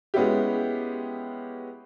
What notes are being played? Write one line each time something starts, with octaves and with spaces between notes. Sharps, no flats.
G#3 B3 C#4 E4 G4